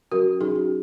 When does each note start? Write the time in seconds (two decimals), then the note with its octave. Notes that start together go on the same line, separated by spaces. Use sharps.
0.11 F#3 C#4 F#4 A#4
0.41 F#3 D#4 G#4
0.45 C#4
0.56 F#4